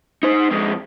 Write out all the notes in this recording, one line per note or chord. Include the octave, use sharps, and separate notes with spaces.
D#4 C5
F2 G#3